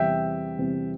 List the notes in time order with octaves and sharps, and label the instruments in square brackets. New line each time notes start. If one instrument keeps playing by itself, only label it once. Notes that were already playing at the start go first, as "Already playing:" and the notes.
Already playing: [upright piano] E2 C3 G3 C4 [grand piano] E5 G5
[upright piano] E2 C3 G3 C4